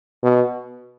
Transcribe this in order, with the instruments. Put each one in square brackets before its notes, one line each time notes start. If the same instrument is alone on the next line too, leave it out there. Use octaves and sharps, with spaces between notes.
[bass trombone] B2